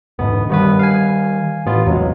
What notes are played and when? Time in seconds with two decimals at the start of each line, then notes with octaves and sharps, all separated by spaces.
0.19 E1 D2 G#2 B3
0.49 G2 D#3 G3 B3 B4
0.79 F5 G#5
1.66 A1 B3 F4
1.86 E2 C3 F#3 G#3